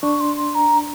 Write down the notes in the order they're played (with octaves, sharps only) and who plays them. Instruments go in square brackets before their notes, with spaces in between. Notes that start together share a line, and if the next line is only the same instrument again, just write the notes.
[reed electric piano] D4 [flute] C#6
[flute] C6
C6
A#5